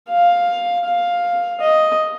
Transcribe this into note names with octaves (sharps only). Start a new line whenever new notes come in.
F5
F5
D#5